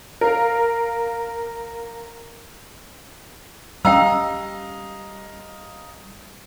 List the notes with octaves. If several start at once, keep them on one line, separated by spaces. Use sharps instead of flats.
A#4 F5
G3 C#4 D#5 F5 G5 A#5 E6